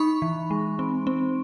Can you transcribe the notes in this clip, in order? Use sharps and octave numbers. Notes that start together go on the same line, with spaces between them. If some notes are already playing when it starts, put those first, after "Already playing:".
Already playing: D#4 B5 C#6
E3
G#3
C4
C4